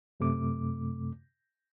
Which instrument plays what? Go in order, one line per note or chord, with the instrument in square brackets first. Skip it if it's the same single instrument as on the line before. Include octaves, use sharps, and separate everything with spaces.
[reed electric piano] F#2 C3 A3 D6